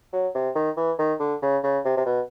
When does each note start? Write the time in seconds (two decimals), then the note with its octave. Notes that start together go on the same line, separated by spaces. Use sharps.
0.13 F#3
0.35 C3
0.55 D#3
0.77 E3
0.99 D#3
1.20 D3
1.42 C#3
1.63 C#3
1.85 C3
1.97 C3
2.06 B2